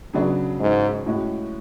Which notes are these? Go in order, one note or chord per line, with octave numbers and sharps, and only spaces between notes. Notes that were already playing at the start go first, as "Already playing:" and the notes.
C#3 F#3 B3 D4 G#4
G#2
A2 G#3 C#4 F#4